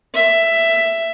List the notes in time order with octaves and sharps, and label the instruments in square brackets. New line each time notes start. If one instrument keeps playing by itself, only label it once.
[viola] E5